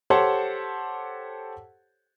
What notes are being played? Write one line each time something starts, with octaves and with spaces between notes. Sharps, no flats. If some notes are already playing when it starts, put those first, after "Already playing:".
G4 A4 C5 C#5 F#5 A5